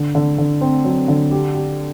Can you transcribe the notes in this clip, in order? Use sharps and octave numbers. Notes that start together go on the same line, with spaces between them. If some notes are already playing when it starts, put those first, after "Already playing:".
Already playing: D3
D3
D3
C4
F#3
D3
G4
G4